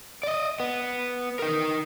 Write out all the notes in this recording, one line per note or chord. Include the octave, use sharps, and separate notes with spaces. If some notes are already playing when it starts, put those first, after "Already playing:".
D5 D#5
B3
D#4 A#4